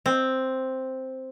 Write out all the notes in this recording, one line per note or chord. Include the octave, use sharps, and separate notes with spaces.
C4